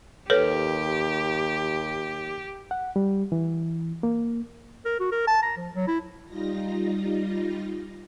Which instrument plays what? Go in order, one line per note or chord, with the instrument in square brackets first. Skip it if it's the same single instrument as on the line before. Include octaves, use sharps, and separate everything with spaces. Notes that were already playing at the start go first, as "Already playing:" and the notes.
[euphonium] D#2 [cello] G4 [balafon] A4 B4 C#5
[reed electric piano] F#5
G3
E3
A#3
[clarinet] A#4
F#4
A#4
A5
A#5
F3
F#3
E4
[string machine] G3 D#4 F4 A#6